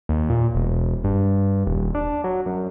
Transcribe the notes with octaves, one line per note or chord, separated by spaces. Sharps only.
D#2
A#2
E1
G2
D#1
D4
F#3
F#2